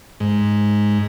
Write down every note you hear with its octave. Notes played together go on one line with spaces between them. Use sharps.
G#2